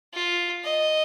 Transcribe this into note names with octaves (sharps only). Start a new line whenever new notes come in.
F4
D#5